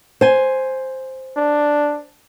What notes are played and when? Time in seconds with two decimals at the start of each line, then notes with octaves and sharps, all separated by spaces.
0.21 C5 G#5
1.37 D4